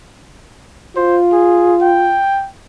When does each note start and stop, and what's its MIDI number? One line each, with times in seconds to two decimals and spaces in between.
0.96 2.19 65
0.96 1.18 72
1.32 1.75 68
1.81 2.48 79